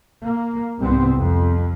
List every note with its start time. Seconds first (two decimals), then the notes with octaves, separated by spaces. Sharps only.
0.20 A#3
0.80 C2 G#2 B3 C4
1.15 F2